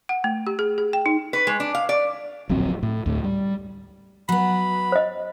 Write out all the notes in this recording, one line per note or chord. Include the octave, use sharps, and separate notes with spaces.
F#5
A3
G4
G#4
G#4
G5
D#4
B4
G#3
D4
F5
D5
D1 A#1 F#3 C4
A2
D2 A2
G3
F#3 B3 B5
C5 D#5